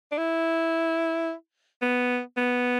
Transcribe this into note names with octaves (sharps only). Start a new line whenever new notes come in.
D4
E4
B3
B3